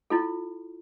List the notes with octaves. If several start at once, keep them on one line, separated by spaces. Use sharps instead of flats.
E4 F4 A4